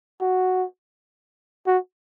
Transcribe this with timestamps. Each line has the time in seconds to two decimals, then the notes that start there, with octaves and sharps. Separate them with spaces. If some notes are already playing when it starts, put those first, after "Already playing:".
0.21 F#4
1.67 F#4